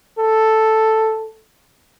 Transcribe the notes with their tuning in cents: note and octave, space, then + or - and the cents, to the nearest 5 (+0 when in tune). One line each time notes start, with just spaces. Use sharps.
A4 +0